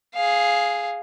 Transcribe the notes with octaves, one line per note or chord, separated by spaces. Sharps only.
G#4 F5